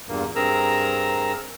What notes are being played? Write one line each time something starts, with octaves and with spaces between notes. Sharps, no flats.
E2 G2 A#2 A#3
G2 C4 G#4 A#4 A#5 E6